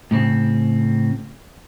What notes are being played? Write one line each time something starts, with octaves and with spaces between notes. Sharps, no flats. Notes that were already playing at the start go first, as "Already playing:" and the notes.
A2 C#3 C4